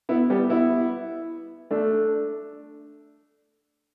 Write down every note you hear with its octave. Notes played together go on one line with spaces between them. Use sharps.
B3 E4
G3 B3
B3 E4
A3 D4